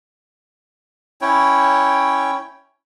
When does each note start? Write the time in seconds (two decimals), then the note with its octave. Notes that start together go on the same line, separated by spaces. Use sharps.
1.21 C#4 E4 C#5 G5